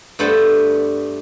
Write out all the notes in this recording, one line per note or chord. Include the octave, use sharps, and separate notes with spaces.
G2 A3 B3 D4 C5 A5